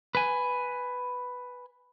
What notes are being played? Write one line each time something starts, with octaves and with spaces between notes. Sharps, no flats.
B4 G#5